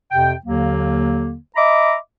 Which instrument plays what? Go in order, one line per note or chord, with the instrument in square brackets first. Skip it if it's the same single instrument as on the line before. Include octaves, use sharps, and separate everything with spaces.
[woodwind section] F2 C3 G5
D#2 D3 F#3 A#3
D#5 E5 A#5 B5 D6